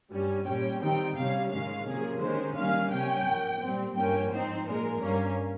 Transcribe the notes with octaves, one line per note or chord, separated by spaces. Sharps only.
G2 G3 C#4
A#2 G3 C#4 G5
D#3 G3 C4 D#4 G5
C3 G3 C#4 F5
G#2 D#3 G#3 C#4 F5
C3 F3 A#3 C#4 G#4
D#3 G#3 C#4 C5
D#3 G3 A#3 C#4 F5
C3 G3 C#4 G5
G#2 F3 A#3
A#2 G3 C4
G2 F3 A#3 C#4 G5
G#2 F3 C4 D#4 C5
A#2 F3 G#3 A#4
G2 G3 A#3 C#4